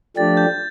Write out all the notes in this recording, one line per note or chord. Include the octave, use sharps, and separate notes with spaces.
F3 A3 D4 G4 A6
G6